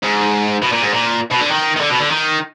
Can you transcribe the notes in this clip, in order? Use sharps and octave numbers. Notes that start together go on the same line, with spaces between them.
G#2
B2
A#2
G#2
A#2
B2
D3
D#3
D#3
D3
B2
D3
D#3